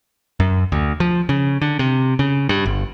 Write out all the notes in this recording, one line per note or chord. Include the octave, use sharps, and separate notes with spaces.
F#2
D2
F3
C#3
D3
C3
C#3
G2
G1